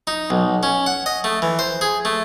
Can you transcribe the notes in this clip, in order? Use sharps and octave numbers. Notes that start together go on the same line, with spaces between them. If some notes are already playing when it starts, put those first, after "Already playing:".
D#4
B1
C#4
F#5
D#5
A3
E3
C5
G#4
A3